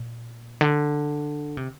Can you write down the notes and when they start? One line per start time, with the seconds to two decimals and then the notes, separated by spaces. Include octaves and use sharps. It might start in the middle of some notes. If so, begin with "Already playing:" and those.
Already playing: A#2
0.61 D3
1.57 C3